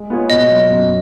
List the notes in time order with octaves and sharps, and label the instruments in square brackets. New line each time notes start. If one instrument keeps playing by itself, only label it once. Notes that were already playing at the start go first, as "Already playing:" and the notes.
Already playing: [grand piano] G#3
B3 F4 G#4 C#5
[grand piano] B2 [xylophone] D#5
[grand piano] F#3 B3
F#2